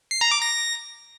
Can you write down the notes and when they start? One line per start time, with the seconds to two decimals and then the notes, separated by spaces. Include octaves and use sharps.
0.11 C7
0.21 A#5
0.31 D6
0.42 A#6